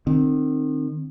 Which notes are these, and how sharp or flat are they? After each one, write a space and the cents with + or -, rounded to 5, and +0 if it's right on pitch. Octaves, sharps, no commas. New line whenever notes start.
D#3 -35 C4 +0